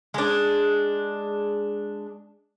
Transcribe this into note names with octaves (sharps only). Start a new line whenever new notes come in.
G#3 D4